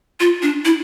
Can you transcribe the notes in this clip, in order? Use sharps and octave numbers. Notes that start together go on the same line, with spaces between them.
F4
D4
E4